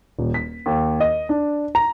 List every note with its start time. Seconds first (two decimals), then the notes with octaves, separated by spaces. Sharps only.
0.19 D#1
0.34 B6
0.66 D#2
1.00 D#5
1.29 D4
1.75 A#5